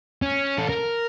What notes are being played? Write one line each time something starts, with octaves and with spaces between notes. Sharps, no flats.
C#4
A4
A#4